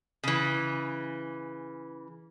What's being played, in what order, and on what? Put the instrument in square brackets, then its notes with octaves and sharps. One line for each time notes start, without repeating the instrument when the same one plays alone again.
[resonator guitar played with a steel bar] C#3 E3